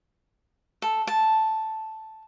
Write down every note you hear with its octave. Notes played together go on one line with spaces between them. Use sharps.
A4
A5